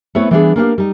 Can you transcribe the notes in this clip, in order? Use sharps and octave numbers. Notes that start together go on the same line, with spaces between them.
A3 B3 C4 E4 B4 C#5
E3 G3 B3 C#4 D4 G#4
A#3 B3 D4 G4 C#5 F5
G3 D#4